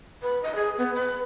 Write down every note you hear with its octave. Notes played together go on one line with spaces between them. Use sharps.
B4
D#5
G#4
B3
B4